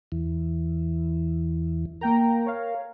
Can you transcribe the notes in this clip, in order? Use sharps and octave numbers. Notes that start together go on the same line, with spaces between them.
E2 E3
A#3 A#4 G5 A#5
C#5 F5